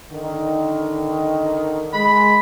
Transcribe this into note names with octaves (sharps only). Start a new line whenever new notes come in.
D3 D#3
G#3 B5